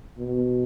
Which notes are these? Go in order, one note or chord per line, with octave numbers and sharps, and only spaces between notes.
B2